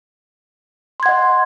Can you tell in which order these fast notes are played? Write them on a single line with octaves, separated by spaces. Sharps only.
C6 G#6 F#5 D#5